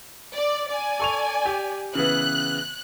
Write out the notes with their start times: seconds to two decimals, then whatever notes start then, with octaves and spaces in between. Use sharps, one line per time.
0.33 D5
0.69 D5 G#5
1.00 A4 C#6 F7
1.46 G4
1.95 C#3 E3 B3 F#6